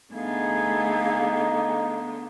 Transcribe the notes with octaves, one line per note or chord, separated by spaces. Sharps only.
D3 A3 B3 D#4 G#4 F5